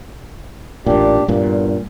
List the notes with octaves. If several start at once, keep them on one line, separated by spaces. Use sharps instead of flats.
A1 A#2 D4 G4
E2 G2 A#2